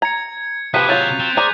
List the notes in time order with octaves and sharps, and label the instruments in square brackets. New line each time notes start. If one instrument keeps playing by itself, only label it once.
[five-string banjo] A#5 [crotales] G#6 C#7
[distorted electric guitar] C3 G#4 [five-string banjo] F3 G4 B4 [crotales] F#6 B6 D#7
[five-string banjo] F#3 F4 [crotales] G6 A6 F7
[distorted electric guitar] C4
[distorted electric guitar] G#4 [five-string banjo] C5 D5 A#5